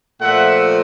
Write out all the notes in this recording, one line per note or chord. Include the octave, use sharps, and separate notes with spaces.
A#2 F3 A3 E5 F#5